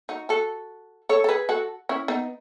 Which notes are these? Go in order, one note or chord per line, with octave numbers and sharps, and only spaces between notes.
D#4 F#4
F#4 A4
A4 C#5
A4
G#4 B4
F#4 A4
C#4 E4
B3 D#4